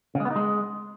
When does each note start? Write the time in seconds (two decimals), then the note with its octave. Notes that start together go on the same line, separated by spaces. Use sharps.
0.15 C#3
0.20 G#3
0.25 B3
0.31 D#4
0.36 G#3